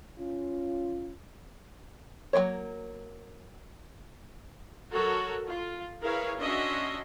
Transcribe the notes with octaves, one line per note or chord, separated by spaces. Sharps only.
C#4 F4
F#3 A3 A#3 C#5
F#3 F#4 A4 A#4 C#5
F4
E4 G#4 A#4 B4 C#5 F5
C#4 D4 F#4 D#5 E5 C6